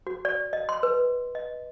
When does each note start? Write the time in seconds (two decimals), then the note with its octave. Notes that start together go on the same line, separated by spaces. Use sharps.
0.07 F#4
0.25 D5
0.53 D#5
0.69 C6
0.83 B4
1.35 D#5